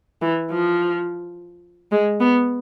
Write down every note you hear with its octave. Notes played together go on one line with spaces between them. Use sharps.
E3
F3
G#3
B3